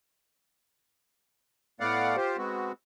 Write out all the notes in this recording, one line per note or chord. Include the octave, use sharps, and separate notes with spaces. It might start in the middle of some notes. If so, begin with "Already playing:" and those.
A2 A3 B3 D5 F5 F#5
F4 G4 C5
G#3 B3 C4 F#4